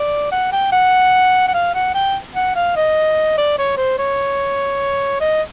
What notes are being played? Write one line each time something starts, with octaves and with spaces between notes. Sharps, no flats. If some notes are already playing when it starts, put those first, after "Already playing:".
Already playing: D5
F#5
G5
F#5
F#5
F5
F#5
G5
F#5
F5
D#5
D5
C#5
C5
C#5
D#5